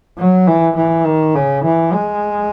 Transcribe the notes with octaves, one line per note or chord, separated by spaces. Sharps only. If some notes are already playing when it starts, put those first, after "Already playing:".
F#3
E3
E3
D#3
C#3
E3
G#3